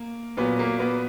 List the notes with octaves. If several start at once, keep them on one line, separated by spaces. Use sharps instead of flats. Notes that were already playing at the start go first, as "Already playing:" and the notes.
Already playing: A#3
A#2 F#3 B3
A#3
B3